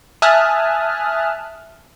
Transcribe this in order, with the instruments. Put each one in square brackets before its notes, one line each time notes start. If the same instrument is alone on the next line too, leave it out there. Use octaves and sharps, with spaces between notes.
[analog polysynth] E5 G#5 A5 D#6 F6 F#6